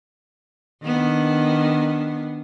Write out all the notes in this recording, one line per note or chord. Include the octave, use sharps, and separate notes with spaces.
D#3 B3 D4